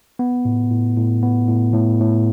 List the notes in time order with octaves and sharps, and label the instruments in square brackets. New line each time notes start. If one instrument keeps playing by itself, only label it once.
[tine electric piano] B3
A2
A2
A2
B3
A2
A2
A2